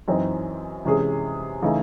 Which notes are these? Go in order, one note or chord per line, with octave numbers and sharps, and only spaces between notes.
F#2 E3 C4 D#4
C3 E3 G#3 C#4 G#4
C#3 E3 A3 D#4